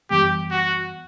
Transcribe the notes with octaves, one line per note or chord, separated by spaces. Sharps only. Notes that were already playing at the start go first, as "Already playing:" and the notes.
F#2 E3 G3 B3 G4
F#4